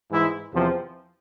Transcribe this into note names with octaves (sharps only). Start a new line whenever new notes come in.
G#2 E3 G#3 E4
E2 C3 F3 C4